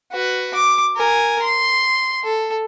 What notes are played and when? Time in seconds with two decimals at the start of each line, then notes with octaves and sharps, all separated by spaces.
0.13 F#4 B4
0.55 D6
0.97 A#4 G#5
1.43 C6
2.24 A4